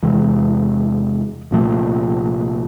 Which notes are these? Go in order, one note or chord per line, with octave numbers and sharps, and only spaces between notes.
E2 C3 E3 G#3
C2 A#2 F3 A3